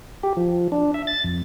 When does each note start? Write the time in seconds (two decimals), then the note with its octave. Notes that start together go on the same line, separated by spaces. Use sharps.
0.23 G4
0.37 F3
0.72 D4
0.94 E5
1.07 A6
1.24 F2